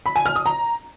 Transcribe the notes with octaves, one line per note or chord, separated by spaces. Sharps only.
B5
G#5
F6
D#6
A#5